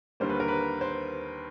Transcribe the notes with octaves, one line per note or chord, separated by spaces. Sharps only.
D#2 D3 G3 A#3 C5
B4
A#4
B4
C5